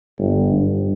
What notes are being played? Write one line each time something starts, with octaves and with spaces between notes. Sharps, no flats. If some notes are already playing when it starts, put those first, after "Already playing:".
G1
G2